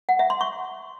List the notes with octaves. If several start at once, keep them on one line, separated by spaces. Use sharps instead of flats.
F#5
E5
C6
C#6